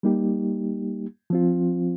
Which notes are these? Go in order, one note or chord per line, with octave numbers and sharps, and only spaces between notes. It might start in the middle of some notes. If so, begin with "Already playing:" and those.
G3 A#3 D#4 G4
F3 C4 F4